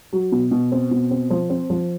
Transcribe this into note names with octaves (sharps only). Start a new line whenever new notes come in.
F#3
B2
B2
C4
B2
C4
F3
C4
F3